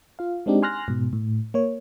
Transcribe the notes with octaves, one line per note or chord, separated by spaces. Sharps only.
F4 F5
G#3 C4 D4 D#4 G4
G#5 C6 F6 F#6 A#6
G#2 B2
A2
A#3 C#5